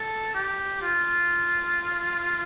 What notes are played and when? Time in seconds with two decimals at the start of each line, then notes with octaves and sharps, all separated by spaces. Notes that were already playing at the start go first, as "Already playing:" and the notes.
Already playing: A4
0.34 G4
0.81 F4